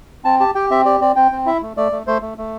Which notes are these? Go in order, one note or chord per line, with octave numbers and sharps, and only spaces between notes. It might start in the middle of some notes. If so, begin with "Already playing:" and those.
C4 A5
G4 A5
G4 G5
C4 E5
G4 D5
C4 D5
C4 G5
C4
E4 E5
A3
A3 D5
A3
A3 C5
A3
A3